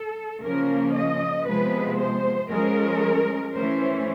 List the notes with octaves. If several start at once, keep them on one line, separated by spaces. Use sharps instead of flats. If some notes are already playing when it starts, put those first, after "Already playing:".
Already playing: A4
C#3 F3 A#3 C#4 A#4
D#5
C3 F3 G#3 B3 B4
C5
F3 G#3 C#4 A#4
E3 A3 C#4 C5